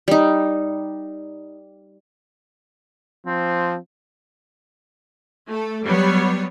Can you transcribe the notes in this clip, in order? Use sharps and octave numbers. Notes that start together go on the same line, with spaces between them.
G3 D#4
F3 C4
A3 A4
F#3 G3 B3 C#5